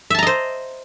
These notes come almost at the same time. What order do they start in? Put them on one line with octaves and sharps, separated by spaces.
E5 A5 A#5 D#5 C5